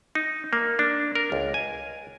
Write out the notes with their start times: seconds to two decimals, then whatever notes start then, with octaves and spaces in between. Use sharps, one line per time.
0.15 D#4
0.53 A#3
0.79 D4
1.15 A#4
1.32 C#2
1.54 G#5